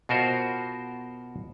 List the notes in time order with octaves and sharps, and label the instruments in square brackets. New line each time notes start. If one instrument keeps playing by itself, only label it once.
[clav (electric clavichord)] B2 F4 F#4 A#4 C5